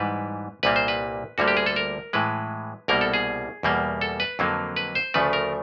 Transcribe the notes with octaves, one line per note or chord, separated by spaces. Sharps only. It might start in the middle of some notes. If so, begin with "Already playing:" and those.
Already playing: G#2 E3 G3 B4
C2 A#2 G3 A#3 B4
C5
B4
D2 D3 G3 A#3 F#4
G4
G#4
A4
A#4
A2 E3 G#3 B4
C2 B2 G3 A#3 A#4
A4
G#4
E2 B2 G3 A#3
A4
B4
F2 D3 F#3 A#3
B4
C5
D2 C#3 F3 A3 B4
A#4